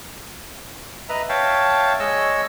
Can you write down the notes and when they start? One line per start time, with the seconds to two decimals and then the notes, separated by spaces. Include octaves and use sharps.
1.09 B4 D#5 E5 A#5
1.29 C#5 E5 F5 G5 A5
2.00 G#3 C#5 D#5 E6